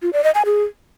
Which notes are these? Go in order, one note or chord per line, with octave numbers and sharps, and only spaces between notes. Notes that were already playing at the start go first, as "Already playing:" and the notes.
F4
D5
D#5
G#5
G#4